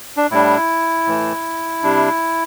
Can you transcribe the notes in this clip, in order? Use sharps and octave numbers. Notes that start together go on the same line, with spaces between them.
D4
A2 G3 D4 E4
A2 E3 A3
C3 G3 D4